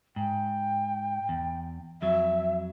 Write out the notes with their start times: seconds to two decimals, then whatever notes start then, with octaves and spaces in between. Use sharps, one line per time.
0.16 G#2 G5
1.29 E2
2.02 F2 F#3 E5